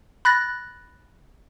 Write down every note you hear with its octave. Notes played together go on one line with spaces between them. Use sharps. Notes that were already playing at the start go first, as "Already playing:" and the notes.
B5 F#6 A6 A#6